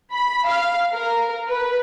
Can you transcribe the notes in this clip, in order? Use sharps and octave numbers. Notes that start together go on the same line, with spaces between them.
B5
F5
A#4
B4